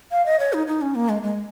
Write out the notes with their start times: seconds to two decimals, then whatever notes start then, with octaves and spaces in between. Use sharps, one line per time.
0.12 F5
0.26 D#5
0.39 C#5
0.53 D#4
0.67 D#4
0.82 C#4
0.95 A#3
1.09 G#3
1.23 G#3